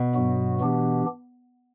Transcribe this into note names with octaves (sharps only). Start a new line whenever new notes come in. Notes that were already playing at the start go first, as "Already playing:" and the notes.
Already playing: B2
G2 F#3 B3 F#4
E3 B3 D4 G4